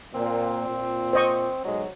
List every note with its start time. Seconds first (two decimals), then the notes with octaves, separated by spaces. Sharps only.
0.14 A#2 C4
0.68 A#2
1.13 C5 D#5 C#6
1.64 B1 F#3 G#3